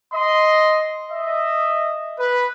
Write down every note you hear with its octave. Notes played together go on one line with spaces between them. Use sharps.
D#5 C6
D#5 E5
B4